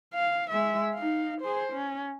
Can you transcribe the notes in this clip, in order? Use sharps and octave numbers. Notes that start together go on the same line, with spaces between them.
F5
G#3 E5
D#4 F5
G#4 C5
C#4